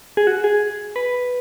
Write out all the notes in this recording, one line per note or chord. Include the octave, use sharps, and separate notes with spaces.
G#4
F#4
G#4
B4